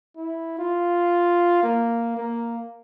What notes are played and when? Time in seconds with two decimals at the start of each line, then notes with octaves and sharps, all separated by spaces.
0.16 E4
0.59 F4
1.63 A#3
2.17 A#3